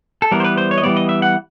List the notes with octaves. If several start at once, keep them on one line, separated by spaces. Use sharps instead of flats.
A4
E3 G3 B3 A#4
C5
B4
C5
C#5
D#5
E3 G3 B3 D5
D#5
E5
F#5